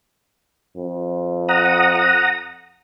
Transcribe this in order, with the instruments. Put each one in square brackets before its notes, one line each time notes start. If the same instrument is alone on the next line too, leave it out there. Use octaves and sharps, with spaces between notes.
[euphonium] F2
[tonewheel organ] F#5 A#5 D#6